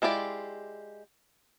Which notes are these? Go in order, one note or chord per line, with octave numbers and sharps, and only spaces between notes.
G#3 E4 F4 G4 D5